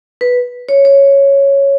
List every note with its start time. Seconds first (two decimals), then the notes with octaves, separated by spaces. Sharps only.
0.21 B4
0.69 C#5
0.85 C#5